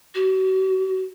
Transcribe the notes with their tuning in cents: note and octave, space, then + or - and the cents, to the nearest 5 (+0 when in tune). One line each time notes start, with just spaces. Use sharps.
F#4 +40